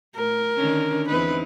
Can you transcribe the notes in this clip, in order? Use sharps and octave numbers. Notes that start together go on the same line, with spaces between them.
A2 A#4
D3 D#3 C#4
E2 C4 D#4 B4